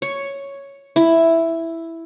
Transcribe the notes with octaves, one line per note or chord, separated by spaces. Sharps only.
C#5
E4